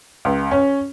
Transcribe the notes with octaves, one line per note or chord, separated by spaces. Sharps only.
C#2
C#4